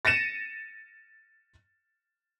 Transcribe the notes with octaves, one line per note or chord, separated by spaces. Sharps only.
A6 A#6 C#7 D#7 E7